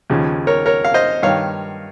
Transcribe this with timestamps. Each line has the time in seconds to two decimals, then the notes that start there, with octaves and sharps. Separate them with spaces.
0.10 D#2 C#3 F3
0.47 A#4 C#5
0.66 A#4 C#5
0.85 F5
0.94 C5 D#5
1.23 G2 D#3 C#5 F5